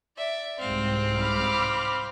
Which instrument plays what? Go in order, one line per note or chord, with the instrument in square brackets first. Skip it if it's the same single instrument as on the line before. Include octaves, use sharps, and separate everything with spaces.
[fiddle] D5 E5
[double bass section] C2 G#2 [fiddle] C4 F5
[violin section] B5 D6 F6